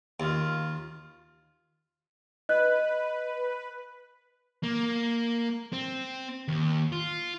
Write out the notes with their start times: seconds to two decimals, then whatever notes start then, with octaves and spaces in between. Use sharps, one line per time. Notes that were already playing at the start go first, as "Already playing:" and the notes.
0.20 D#2 F4
2.49 B4 D#5 F#6
4.63 A#3
5.73 C4
6.48 D#2
6.92 F4